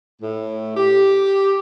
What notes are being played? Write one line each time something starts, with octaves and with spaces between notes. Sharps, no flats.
A2
G4